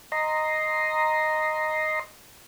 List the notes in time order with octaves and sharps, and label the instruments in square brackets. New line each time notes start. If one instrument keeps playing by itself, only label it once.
[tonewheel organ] D#5 A#5 C6